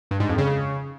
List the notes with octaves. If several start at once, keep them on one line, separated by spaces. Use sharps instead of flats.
G2
G#2
F2
C#3